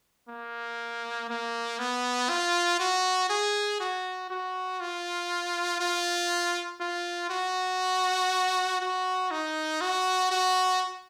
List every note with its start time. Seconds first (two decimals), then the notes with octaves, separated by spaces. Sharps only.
0.29 A#3
1.29 A#3
1.79 B3
2.29 F4
2.80 F#4
3.29 G#4
3.80 F#4
4.30 F#4
4.80 F4
5.80 F4
6.81 F4
7.30 F#4
8.81 F#4
9.31 D#4
9.81 F#4
10.32 F#4